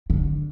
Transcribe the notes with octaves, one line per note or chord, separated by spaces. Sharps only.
D3